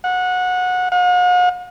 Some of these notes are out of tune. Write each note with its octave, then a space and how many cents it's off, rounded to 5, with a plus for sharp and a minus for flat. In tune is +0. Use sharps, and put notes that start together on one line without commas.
F#5 -20
F#5 -45